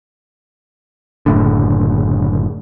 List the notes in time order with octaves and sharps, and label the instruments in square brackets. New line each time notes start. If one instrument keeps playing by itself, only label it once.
[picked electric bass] F#1 A2 D3